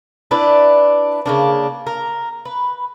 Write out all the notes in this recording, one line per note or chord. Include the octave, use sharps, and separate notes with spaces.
D4 E4 B4 D5
C#3 A#3 D4
A#4
B4